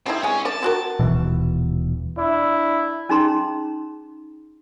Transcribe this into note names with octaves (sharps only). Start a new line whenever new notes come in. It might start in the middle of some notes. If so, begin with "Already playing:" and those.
G3 C4 D#4 E4
G#3 C#4 G#5
D5 A5
C4 F#4 A#4
D#1 B2 E3
D4 E4
C#4 D#4 G#4 A#5 C6